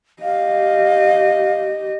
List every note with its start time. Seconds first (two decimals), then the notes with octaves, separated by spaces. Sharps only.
0.22 G4 D#5 F5